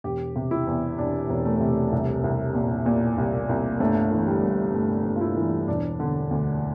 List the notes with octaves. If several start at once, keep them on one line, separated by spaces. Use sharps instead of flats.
E1 G4
C3
E4
E2
E1 D4
E1
A3
C3
C2
C2
A#2
A#2
C2
C2
G1 A3
E3
G3
G2
G1 A3
G1
F4
E4
E3
E1 D4
D3
D2